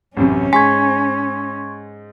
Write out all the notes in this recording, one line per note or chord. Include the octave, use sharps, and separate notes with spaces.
A1 F#2 C3 C#4
G#2 G#5 C6 C#6 G#6 B6